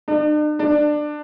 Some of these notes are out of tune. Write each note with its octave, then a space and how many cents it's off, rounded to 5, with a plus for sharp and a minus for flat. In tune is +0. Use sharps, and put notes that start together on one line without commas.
D4 +45
D4 +20